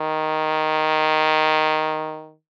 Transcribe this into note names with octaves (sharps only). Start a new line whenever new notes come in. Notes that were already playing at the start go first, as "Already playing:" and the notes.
Already playing: D#3